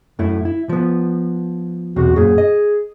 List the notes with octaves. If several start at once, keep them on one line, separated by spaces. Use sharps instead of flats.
F#2 A3 E4
E4
F3 B3
B1 E2 C3 F#4
F#2 A#2 G#4
D#5